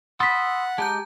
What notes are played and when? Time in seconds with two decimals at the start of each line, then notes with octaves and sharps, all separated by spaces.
0.20 F#5 B5 C6 D#6 E6 A6 B6
0.78 G#3 G4 A5 A#5 G6